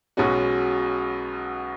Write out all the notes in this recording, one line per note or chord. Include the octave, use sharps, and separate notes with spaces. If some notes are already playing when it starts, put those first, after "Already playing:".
B1 B2 G#3 C#4 F#4